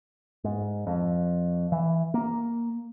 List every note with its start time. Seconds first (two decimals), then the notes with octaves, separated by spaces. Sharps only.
0.44 G#2
0.87 F2
1.72 E3
2.14 A#3